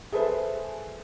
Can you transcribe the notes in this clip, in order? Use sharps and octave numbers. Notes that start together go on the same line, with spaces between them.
G#4 A4 B4 C5 E5